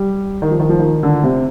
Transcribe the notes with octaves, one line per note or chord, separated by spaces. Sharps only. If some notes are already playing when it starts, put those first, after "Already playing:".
Already playing: G3
D#3
F3
D#3
F3
D#3
D3
C3